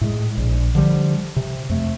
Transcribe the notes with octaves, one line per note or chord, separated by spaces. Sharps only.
A2 G#3
A#1
D3 F3 G3
C3
F2 A3